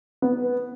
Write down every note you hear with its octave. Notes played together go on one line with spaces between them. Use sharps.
B3